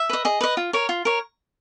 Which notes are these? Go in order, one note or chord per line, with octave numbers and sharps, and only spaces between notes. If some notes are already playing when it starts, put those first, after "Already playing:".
Already playing: E5
B4 D#5
G#4 D#5
B4 D#5
F4
A#4 C#5
F4
A#4 C#5